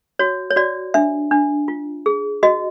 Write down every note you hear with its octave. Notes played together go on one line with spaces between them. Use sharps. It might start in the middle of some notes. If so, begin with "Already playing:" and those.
F#4 C#5
C#5
F#4 D5
D4 E5
D4
F4
G#4
F#4 D#5